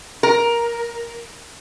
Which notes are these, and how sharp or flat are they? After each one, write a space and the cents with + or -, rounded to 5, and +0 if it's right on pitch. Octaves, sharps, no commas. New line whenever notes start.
A#4 +10